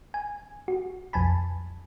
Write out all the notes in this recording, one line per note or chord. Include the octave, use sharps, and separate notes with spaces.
G#5
F#4
B1 F2 G#5 A5 B5